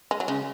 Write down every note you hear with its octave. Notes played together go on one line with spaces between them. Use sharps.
G#3
F#3
C#3 G#3